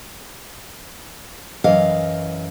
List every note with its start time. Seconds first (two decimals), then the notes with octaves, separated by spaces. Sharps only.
1.64 F#2 E3 D#5 F5